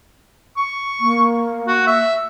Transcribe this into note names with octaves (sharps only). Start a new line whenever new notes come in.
C#6
A#3
F#4
E5